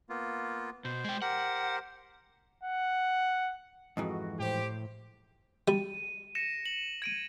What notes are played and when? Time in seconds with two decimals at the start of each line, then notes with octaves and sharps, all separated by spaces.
0.09 A#3 B3 F4
0.85 B2 C5
1.04 G#3 G5
1.22 G4 A#4 C5 F#5
2.63 F#5
3.97 F2 G#2 E3 F#4
4.40 A2 G4 C5
5.68 G3 D#7
6.35 A#6 C#7 E7
6.66 F#7
7.02 G#6 D7 D#7